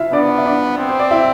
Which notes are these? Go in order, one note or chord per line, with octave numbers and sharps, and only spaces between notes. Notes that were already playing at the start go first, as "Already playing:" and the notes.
Already playing: E4 F4 E5 F5
B3 D4 D5
E5
D4 D5
C4
C5
D5
E4 E5